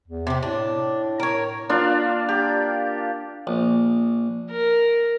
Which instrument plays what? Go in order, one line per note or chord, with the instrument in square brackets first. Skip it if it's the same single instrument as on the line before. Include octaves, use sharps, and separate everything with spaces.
[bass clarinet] E2
[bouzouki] C3 G4
[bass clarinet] A2 [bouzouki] D4
[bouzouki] A#4 C#5
[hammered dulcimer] A#3 D4 F4 F5
G4
[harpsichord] A#1
[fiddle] A#4